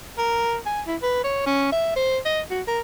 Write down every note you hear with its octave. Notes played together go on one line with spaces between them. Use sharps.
A#4
G#5
E4
B4
C#5
C#4
E5
C5
D#5
F#4
A#4